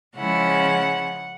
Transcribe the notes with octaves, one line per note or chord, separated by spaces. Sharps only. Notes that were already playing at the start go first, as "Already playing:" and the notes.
C#3 F3 G#3 C#4 E4 F#5